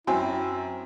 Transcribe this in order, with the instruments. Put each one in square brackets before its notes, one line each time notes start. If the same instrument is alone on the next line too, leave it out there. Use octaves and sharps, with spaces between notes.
[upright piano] F#2 F#3 [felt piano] C4 G5 C6 [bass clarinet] E4 [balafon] G#5